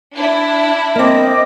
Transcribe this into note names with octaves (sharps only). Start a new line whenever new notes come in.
D4 E4
A#3 C4 D#5 D6